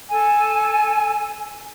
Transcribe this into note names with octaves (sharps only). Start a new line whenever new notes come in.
A4 G#5